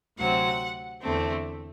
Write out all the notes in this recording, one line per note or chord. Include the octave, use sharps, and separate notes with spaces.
D2 C3 F#3 C4 F#5
E2 D3 A3 C4